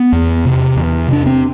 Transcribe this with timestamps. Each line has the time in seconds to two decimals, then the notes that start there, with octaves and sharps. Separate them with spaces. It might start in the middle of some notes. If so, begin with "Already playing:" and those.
Already playing: B3
0.12 E2
0.45 C3
0.77 E2
1.08 C3 D4
1.26 C4